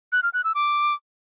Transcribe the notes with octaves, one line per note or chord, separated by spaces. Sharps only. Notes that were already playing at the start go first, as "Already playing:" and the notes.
F#6
F6
F#6
E6
D6